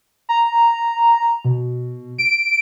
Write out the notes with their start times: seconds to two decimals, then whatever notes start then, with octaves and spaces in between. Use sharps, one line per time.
0.29 A#5
1.45 B2
2.18 D7